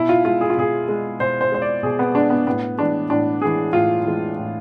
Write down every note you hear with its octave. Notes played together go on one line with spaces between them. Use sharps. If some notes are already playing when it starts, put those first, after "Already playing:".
Already playing: B2 E4
F4
G#3 F4
G#4
F4
B2 G#4
G#3
B2 C5
C5
G#3 C5
D5
B2 G#4
B3
G#3 D4
B3
A2 B3
E3 G#3 D4
A2 D4
E3 G#3 G#4
A2 F4
E3 G#3
A2